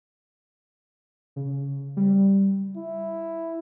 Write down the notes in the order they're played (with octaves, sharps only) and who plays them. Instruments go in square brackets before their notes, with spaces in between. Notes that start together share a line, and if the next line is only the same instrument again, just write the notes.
[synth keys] C#3
G3
[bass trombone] E4